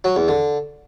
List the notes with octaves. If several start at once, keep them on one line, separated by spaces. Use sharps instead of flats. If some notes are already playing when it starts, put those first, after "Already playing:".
F#3
E2
D3